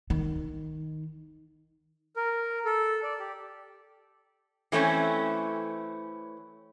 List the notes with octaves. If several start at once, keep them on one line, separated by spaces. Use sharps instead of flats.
D#3
A#4
A4
D5
G4
E3 A3 C4 C#4